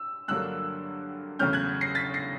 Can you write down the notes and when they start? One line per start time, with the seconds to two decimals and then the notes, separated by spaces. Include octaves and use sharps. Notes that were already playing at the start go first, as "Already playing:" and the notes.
Already playing: E6
0.28 G2 D3 F#3 A#3 D4 E6 F#6
1.39 E2 C#3 F#3 A3 C#4 F6 G6
1.53 F#6 G#6
1.81 A#6 C7
1.95 A6 B6
2.14 A#6 C7